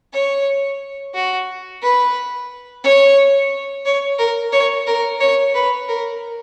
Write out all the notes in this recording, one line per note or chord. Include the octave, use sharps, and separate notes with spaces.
C#5
F#4
B4
C#5
C#5
A#4
C#5
A#4
C#5
B4
A#4